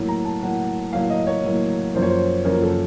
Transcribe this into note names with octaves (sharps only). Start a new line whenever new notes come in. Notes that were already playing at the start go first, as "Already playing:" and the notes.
Already playing: A2 F#3 A#3
A#5
A5
A2 F#3 A#3 F#5
A2 F#3 A#3 F5
D#5
C#5
A2 F#3 A#3
F#2 F3 A#3 C5
C#5
C5
F#2 F3 A#3 A#4
A4